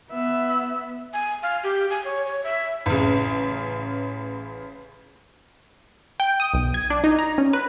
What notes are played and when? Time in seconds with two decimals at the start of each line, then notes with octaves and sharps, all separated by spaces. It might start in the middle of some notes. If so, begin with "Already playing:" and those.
0.10 B3 E5
1.13 G#5
1.43 F5
1.63 G4
1.90 G#5
2.05 C#5
2.27 C#5
2.44 E5
2.86 A1 C#3
6.20 G5
6.40 D#6
6.54 B1
6.74 G#6
6.90 D4
7.04 D#4
7.19 A#5
7.38 C#4
7.53 B4